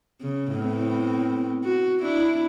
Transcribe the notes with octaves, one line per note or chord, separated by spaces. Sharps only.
C#3
A2 B3 C4
F#4
D4 E4